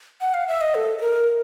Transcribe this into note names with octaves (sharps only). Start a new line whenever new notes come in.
F#5
F5
E5
D#5
A4
A4
A#4